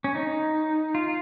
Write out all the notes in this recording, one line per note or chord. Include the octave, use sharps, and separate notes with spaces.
C#4
D#4
F4